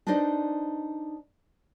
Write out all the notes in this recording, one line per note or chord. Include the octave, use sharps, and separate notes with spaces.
D4 D#4 B4 C5 D5 D#5